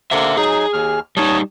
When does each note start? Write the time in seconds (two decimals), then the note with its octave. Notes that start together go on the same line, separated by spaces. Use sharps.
0.11 D3 A#3 C5 E5
0.37 F#3 D#4 G#4
0.73 D#2 F6
1.17 G3 D#4 C#5 A5 D#6